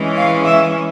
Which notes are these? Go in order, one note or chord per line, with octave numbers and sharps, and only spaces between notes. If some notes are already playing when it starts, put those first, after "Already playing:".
Already playing: E3 G#3 C#4
F5
E5